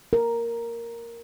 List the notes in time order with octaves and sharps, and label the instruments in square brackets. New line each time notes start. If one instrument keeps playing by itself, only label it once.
[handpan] A#4